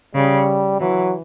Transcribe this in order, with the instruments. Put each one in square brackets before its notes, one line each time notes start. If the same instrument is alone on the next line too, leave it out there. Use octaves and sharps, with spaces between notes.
[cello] C#3 [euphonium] G3
[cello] E3 [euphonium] F#3